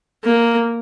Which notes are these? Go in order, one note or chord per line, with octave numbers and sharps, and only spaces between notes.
A#3